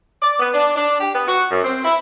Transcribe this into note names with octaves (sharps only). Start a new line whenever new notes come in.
D5
B3
D4
D4
G4
B3
F#4
F#2
C4
E4